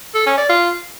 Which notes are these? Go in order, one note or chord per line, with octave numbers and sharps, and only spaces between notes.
A4
C#4
D5
F4